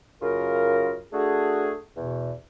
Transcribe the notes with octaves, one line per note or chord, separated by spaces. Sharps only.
F#2 C#3 F4 A#4
A3 D4 F#4 G#4
E2 B2